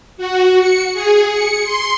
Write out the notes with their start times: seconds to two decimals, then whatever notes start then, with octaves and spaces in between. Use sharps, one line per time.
0.17 F#4
0.60 C#7
0.93 G#4
1.33 C#7
1.64 C6